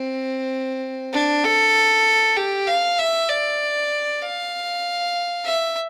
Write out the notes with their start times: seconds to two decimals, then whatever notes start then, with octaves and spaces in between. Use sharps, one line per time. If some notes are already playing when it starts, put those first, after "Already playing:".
Already playing: C4
1.13 D4
1.44 A4
2.36 G4
2.67 F5
2.98 E5
3.29 D5
4.22 F5
5.45 E5